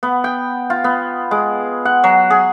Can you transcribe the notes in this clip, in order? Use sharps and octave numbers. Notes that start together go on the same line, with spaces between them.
B3
G5
F4
B3
G#3
F#5
F#3
G#4